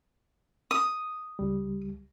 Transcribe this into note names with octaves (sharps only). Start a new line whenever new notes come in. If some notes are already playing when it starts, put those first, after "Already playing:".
D#6
C#2 G3